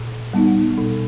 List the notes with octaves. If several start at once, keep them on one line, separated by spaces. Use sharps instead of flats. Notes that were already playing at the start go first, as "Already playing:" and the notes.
Already playing: A#2
G3 B3 D#4
B2